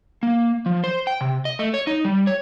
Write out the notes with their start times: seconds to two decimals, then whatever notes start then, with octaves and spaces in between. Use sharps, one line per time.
0.23 A#3
0.66 F3
0.84 C5
1.07 G5
1.21 C3
1.45 D#5
1.59 A3
1.74 C#5
1.87 D#4
2.05 G3
2.27 C#5